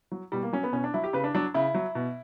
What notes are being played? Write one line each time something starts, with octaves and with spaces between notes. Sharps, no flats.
F#3
B2 G3
A#3
F#3 C#4
B3
B2 C#4
D4
F#3 E4
G4
C#3 B4
D4
F#3 D4
C#3 E4
F#3
B2